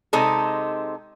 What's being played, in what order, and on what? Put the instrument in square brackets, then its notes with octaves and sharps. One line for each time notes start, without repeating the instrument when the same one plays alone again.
[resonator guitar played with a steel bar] C3 G#3 D#4 A4